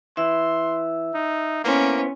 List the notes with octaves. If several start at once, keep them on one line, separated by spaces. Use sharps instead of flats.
E3 E5 C6 E6
D#4
A#3 B3 C#4 E4 C5